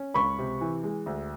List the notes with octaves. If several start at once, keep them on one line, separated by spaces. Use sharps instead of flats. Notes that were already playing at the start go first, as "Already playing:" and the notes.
Already playing: C#4
C#2 B5 C#6
C3
E3
G#3
D2